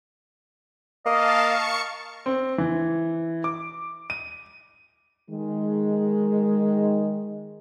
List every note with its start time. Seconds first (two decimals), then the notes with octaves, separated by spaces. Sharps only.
1.06 A#3 D#5 F5 A5
1.41 C#6 C#7
2.26 C4
2.58 E3
3.44 D6
4.10 D#7
5.29 D#3 G#3